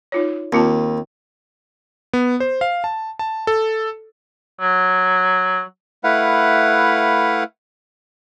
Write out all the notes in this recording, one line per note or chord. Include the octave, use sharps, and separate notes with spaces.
D#4 F4 C#5
D#2 C4 F4 A5
B3
C5
F5
A5
A5
A4
F#3
A3 E4 B4 F5 F#5